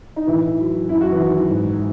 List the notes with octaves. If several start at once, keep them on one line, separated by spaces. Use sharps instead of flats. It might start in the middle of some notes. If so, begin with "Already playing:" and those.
D#4
A2 E3 E4
F#3
F#2 E4
F#4
E3 E4
D#3 F#3
G#2